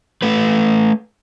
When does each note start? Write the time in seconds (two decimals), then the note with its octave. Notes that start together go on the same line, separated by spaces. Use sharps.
0.22 A3 B4